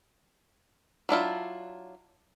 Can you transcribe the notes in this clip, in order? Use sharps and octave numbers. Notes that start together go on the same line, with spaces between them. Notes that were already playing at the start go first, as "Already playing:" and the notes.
F#3 D4 E4 F4